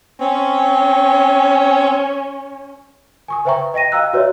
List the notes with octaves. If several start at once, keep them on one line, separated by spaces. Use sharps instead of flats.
C4 C#4
G#5 C#6 D#6
B4 C5 E5 G5 A#5 C#6
D#5 G5 A#6 D#7
D#5 F5 G5 A#5 E6 F#6
F#4 B4 C#5 D5 E5